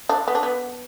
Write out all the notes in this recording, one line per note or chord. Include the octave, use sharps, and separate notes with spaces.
D4
B3
D4
B3